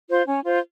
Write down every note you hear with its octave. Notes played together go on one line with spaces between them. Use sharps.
F4 C5
C#4
F4 C5